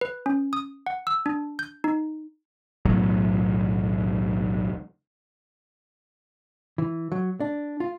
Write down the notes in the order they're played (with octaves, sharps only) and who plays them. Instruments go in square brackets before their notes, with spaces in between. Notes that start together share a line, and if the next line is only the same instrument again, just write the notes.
[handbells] B4
C#4
D#6
F#5
E6
D4
G6
D#4
[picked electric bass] B1 E2 A2 F#3
[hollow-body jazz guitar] E3
F#3
D4
F4